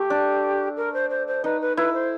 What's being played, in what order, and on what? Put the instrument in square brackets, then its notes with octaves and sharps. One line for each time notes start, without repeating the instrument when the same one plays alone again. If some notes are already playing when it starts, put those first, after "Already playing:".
Already playing: [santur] A3 [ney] G4
[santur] D4
[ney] A#4
C5
C5
C5
[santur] D#4 [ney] B4
[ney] B4
[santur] E4 [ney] B4
[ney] C5